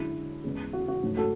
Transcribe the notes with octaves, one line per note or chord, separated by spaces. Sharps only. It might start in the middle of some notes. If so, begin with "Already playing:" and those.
Already playing: F#2 D3 G#3 E4
E2 C#3 G#3
F#4
F#4
G#2 F#3 A3
F#4 A4